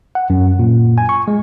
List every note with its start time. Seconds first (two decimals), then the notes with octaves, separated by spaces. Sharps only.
0.15 F#5
0.30 F#2
0.59 A#2
0.98 G#5
1.09 C#6
1.28 G#3